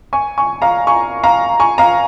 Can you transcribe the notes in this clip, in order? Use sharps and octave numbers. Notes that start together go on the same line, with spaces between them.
G#5 C#6
G#5 C#6
F5 A#5
G#5 C#6
F5 A#5
G#5 C#6
F5 A#5